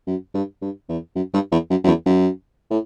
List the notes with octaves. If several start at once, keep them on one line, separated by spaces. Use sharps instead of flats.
F#2
G2
G2
E2
F#2
G2
E2
F#2
F#2
E2
F#2
A2